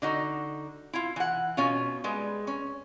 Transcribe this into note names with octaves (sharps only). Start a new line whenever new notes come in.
D3 D#4 F#4
E4 F4
E3 F#5
B2 C#4 F4
G3 G#3 B4
C#4